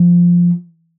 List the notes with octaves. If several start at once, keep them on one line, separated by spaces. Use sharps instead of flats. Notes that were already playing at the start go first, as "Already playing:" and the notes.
Already playing: F3